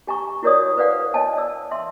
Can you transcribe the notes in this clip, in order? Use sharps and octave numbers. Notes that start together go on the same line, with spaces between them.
G4 G#5 A#5 C#6
E4 F#4 A#4 C#5 D5 D#6
B4 C5 D5 F5 F#5
C#5 D#5 G#5 A5
D5 E6
E5 C6